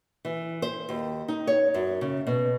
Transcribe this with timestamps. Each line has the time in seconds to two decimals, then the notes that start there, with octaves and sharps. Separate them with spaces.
0.25 E3
0.62 C5
0.89 D#2
1.28 D#4
1.47 C#5
1.74 F#2
2.01 C#3
2.27 B2